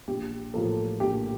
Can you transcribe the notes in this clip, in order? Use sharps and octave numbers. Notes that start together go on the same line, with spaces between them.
A#1 G4
A2 F3 A#3 A4
A#1 G4